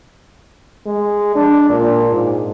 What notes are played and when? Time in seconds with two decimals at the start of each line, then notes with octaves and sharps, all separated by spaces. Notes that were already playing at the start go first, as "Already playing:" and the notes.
0.86 G#3
1.36 D4
1.69 A#2
2.12 G#2